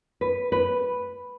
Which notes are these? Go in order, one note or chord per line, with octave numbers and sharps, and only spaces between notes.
B4
B4